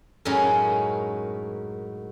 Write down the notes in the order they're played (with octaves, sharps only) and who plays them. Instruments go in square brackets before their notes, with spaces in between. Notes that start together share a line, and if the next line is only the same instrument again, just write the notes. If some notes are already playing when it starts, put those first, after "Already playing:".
[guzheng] F#2 A2 G#3 C#4 D#4 A#4